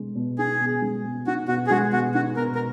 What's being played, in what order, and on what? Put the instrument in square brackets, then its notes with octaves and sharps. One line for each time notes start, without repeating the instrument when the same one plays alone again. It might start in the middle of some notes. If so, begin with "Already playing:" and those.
Already playing: [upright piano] B2 G#3
B2
[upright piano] D#4 [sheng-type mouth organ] G#4
[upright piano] B2
G#3
B2
[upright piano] D#4 [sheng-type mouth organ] F#4
[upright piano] B2 [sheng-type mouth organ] F#4
[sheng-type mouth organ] G#4
[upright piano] G#3 [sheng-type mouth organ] F#4
[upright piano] B2 [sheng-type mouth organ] F#4
[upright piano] D#4 [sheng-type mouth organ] F#4
[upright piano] B2 [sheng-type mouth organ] A#4
[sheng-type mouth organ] A#4